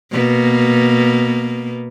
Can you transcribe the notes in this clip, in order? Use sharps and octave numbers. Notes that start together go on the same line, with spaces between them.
B2 A#3 B3